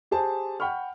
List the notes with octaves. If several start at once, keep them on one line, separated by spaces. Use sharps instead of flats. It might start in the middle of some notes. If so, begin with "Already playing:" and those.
G4 G#4 C5 A5
F#5 G5 B5 C#6 F6